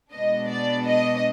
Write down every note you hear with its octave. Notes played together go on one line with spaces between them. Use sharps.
B2 G#3 B3 D4 D#5
D5
D#5